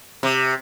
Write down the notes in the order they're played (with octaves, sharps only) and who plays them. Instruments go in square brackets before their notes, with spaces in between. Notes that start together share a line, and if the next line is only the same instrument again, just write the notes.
[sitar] C3